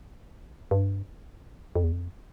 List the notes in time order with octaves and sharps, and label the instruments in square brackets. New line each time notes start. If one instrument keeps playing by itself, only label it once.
[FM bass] G2
F2
E2
F2